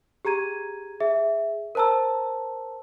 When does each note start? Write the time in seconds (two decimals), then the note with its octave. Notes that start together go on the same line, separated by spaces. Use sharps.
0.25 G4 G#4 A#5 G#6 D#7
1.00 G#4 E5
1.75 A#4 C5 A5 A#5 E6